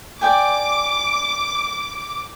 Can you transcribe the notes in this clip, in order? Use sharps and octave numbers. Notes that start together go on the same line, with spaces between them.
D5 G5 G#5 D6